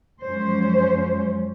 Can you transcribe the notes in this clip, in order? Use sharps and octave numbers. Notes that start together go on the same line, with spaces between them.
F#2 F3 G#3 C#4 C5